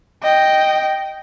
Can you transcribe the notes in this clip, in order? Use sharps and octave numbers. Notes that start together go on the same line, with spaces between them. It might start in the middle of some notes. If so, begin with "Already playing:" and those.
D#5 G5